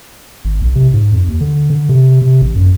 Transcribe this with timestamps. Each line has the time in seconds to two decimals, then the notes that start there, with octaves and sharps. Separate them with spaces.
0.45 G#1
0.62 B1
0.75 C3
0.94 G#2
1.13 F2
1.28 D#2
1.41 D3
1.70 D3
1.89 C3
2.22 C3
2.42 A1
2.56 F#2